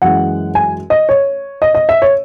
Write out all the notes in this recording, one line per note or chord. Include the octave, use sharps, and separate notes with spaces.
F#2 E3 G#3 F#5
G#5
D#5
C#5
D#5
D#5
E5
C#5